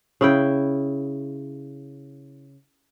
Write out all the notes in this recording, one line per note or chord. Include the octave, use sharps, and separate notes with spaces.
C#3 E4 G5